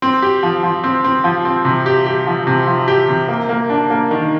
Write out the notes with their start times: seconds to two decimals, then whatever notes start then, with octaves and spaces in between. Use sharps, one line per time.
0.02 C4
0.22 G4
0.43 F3
0.63 F3
0.84 C4
1.04 C4
1.24 F3
1.45 C4
1.65 C3
1.86 G4
2.06 G4
2.27 F3
2.47 C3
2.67 F3
2.88 G4
3.08 C3
3.28 A#3
3.49 A#3
3.70 D4
3.90 A#3
4.11 D#3